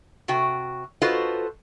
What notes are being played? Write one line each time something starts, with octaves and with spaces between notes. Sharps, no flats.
C3 F#4 G5
F4 F#4 A4 B4 C5 D#5